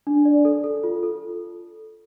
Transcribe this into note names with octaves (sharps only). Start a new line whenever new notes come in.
D4
D5
A4
A4
F4
A4